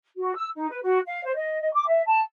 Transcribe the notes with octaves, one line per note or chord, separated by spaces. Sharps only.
F#4
E6
D#4
B4
F#4
F5
C5
D#5
D#5
D6
E5
A5